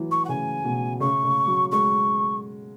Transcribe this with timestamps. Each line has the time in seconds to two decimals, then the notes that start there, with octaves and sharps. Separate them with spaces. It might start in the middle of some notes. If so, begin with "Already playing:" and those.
Already playing: E3 F#3
0.11 C#6
0.25 F#5
0.29 C#3 G#5
0.65 B2
1.00 C#3 C#6
1.24 C#3
1.47 F#3
1.71 G#3 C#6